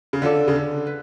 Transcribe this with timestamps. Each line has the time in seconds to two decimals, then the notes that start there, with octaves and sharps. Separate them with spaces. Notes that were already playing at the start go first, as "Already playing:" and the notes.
0.13 C#3
0.22 D3 C#4 F4 A4 D5
0.48 C#3
0.55 D3
0.87 B4